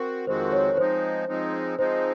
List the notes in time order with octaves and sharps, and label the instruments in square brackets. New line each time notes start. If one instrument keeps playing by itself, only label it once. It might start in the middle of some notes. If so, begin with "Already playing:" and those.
Already playing: [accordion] C4 F#4 [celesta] A#4
[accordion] F2 D#3 G#3 C4 F#4 [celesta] C5
[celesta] C#5
[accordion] F3 G#3 C4 D#4 [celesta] C5
[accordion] F3 G#3 C4 D#4
[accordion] F3 G#3 C4 D#4 [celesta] C5